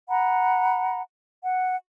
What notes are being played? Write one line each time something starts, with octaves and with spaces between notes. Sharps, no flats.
F#5 A#5 B5
F#5